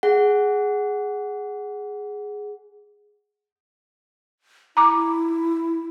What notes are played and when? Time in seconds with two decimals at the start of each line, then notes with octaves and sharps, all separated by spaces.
0.03 G#4 F#5
4.77 E4 A#5 D6